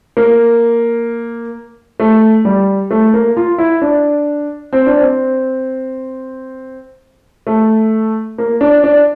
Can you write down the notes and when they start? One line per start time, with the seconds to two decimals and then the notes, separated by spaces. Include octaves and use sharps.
0.17 A#3
2.00 A3
2.45 G3
2.91 A3
3.14 A#3
3.37 F4
3.58 E4
3.82 D4
4.73 C4
4.87 D4
5.01 C4
7.47 A3
8.38 A#3
8.61 D4
8.84 D4